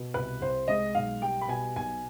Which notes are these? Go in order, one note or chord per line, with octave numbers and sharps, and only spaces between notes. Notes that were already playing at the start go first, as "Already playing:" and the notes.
Already playing: B2
C2 B4
C2 C5
G#3 D#5
B1 F5
G3 G5
B5
B2 G#5
B1 G#5